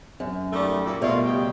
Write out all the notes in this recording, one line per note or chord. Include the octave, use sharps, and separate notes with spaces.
F#2
D#3 G3 A3
A#2 A4
B2 G3 A3 F4 A#4
C#3 G4